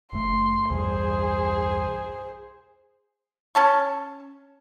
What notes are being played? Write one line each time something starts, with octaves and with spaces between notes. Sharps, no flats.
F#1 A3 C6
B1 E2 G2 G#4 C5
C#4 A5 C#6